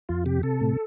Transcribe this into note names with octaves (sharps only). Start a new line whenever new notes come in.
F2 F4
C3 G4
C3 A4
A2